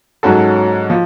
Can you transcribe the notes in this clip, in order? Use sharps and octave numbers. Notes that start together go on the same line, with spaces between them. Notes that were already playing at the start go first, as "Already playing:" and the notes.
G#2 F#3 C#4 F#4 A4
F3